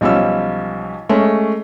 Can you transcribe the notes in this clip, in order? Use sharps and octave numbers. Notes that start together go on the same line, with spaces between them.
B1 F3 G3 C#4 E6
G#3 A3 C#4